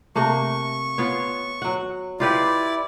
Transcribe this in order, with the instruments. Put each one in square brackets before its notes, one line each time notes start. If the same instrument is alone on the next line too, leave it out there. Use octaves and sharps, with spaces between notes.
[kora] C3 A3 A#3 [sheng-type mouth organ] C#6
[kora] B3 F4 C#5
F#3 F#5
[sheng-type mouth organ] E4 D5 [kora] F4 G4 B4